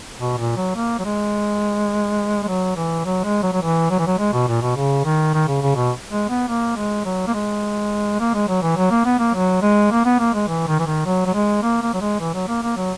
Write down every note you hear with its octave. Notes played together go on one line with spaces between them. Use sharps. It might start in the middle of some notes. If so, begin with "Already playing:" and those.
B2
A#2
F#3
A#3
F#3
G#3
G#3
F#3
E3
F#3
G#3
F#3
F#3
E3
F#3
E3
F#3
G#3
B2
A#2
B2
C#3
D#3
D#3
C#3
C#3
B2
G#3
B3
A#3
G#3
F#3
A#3
G#3
A#3
G#3
F#3
E3
F#3
A#3
B3
A#3
F#3
G#3
A#3
B3
A#3
G#3
E3
D#3
E3
D#3
F#3
F#3
G#3
A#3
A#3
F#3
G#3
E3
F#3
A#3
A#3
F#3